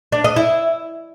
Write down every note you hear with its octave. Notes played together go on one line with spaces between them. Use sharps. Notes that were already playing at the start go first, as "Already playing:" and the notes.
D4
D#5
E4